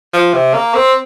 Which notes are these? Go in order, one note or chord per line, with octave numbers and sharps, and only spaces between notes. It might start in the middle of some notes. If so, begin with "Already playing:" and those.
F3
C3
A#3
C4